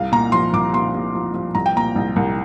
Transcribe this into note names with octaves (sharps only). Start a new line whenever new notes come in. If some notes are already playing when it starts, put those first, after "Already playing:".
Already playing: C2 F5
A#2 A#5
F3 C6
C2 D6
A#2 C6
A#2
F3
F3
C2 A#5
G5
A#2 A#5
C2
C2